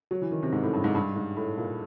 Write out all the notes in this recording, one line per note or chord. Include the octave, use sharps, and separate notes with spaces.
F#3
E3
D#3
C3
G#2
A2
G2
G#2
G2
G#2
A2
A#2